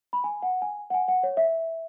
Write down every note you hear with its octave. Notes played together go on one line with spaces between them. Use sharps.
B5
G#5
F#5
G#5
F#5
G#5
F#5
C#5
E5